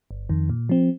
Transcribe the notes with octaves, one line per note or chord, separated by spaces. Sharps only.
G1
F2 D#3
A#2
F3 C4